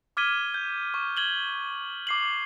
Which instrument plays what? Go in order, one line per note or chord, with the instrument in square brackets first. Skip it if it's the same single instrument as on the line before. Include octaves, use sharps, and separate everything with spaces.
[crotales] D6 F6 G#6 B6 D#7 G7
G6
C#6
G#6 F#7 G7
D6 C7 F#7